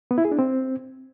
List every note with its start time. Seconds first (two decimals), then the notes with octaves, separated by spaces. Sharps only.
0.11 B3
0.18 E4
0.25 G#4
0.32 D4
0.39 C4